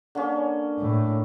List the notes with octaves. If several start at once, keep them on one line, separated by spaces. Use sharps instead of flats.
D3 A#3 C#4
A2